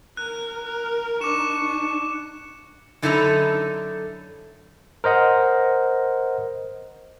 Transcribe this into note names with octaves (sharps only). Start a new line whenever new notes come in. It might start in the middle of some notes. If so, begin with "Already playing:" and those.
A#4 F#6
A#4
D4 D#4 C#6 D6 E7
F#2 D3 D#4 E4 A4 A#5
A#4 C5 D#5 F#5